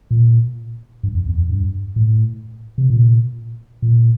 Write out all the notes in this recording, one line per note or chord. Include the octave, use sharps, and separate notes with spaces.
A#2
G2
F2
E2
F2
G2
A2
C3
A#2
A#2